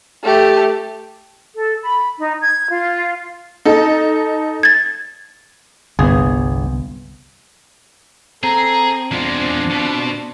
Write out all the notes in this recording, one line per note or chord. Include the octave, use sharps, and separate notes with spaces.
A3 G4
A4
B5
D#4
G#6
F4
D#4 A4
G#6 A6
G1 C2 B3 G#4
C4 G#4 A4 A#5
E2 G#3 D4 F4
B2